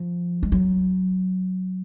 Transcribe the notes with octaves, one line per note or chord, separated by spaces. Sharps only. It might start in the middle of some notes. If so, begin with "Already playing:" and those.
Already playing: F3
G#3
F#3